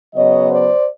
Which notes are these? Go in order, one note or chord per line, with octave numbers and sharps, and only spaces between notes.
C#3 F#3 B3 C#5 D#5
C5 D5